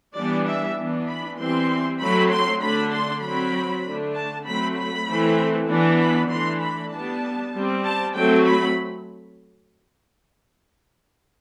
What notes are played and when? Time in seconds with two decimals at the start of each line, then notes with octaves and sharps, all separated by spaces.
0.16 E3 G3 B3 D4 D5
0.47 E5
0.78 E3 B3 D4
1.09 B5
1.39 E3 G3 C4 C6
2.00 F#3 A3 C4 B5
2.31 C6
2.62 D3 A3 D4 B5
2.93 C6
3.23 F#3 C4 B5
3.85 D3 A3 D4
4.16 A5
4.46 F#3 A3 C4 B5
4.77 B5
5.08 E3 A3 C4
5.68 E3 B3 D4
5.99 B5
6.30 E3 A3 D4 C6
6.61 B5
6.91 G3 B3 D4 A5
7.53 G3 C4
7.84 A5
8.14 F#3 A3 C4 G5
8.45 B5